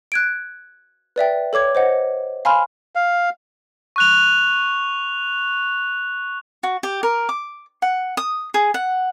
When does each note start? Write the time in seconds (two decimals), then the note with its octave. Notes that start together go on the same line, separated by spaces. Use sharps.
0.12 F#6 G#6 D7
1.16 B4 D5 E5 G5
1.53 A4 C#5 D6 G#6
1.75 C5 D#5 F#5
2.45 F5 G#5 B5 C6 F6
2.95 F5
3.96 C#6 F#6 F7
6.63 F#4
6.83 G4
7.03 A#4
7.29 D6
7.82 F#5
8.17 D#6
8.54 G#4
8.74 F#5